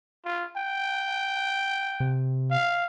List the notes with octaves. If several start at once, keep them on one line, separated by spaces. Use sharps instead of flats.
F4
G5
C3
F5